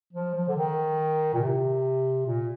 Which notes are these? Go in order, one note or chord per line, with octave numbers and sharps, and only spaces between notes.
F3
F3
D3
D#3
A#2
C3
A#2